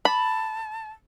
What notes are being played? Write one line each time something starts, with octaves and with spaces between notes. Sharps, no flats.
A5 B5